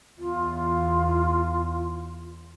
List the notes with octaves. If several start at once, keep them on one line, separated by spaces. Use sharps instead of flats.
E2 F4